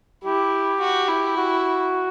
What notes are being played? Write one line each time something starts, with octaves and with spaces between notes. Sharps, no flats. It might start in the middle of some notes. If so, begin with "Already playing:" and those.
E4 G4
F#4
E4
F#4